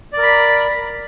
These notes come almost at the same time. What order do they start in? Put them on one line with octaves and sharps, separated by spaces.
D5 A#4 B5